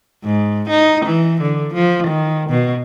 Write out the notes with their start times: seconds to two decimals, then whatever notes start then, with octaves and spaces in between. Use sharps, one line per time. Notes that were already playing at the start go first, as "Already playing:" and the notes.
0.23 G#2
0.69 D#4
1.05 E3
1.41 D3
1.74 F3
2.07 D#3
2.49 B2